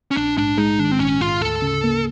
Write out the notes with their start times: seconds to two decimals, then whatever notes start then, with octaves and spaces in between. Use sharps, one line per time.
0.11 C#4
0.16 A#1 D4
0.37 G#2 D4
0.58 G#3 D#4
0.79 D#3 D4
0.91 C4
0.99 A#1 C#4
1.21 G#2 F4
1.41 D2 A4
1.62 C#3
1.84 A#3